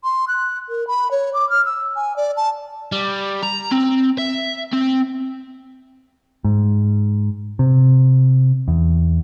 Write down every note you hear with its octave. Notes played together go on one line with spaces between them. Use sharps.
C6
F#6
A#4
B5
C#5
D6
F6
E6
G#5
D5
A5
G3
A#5
C4
E5
C4
G#2
C3
E2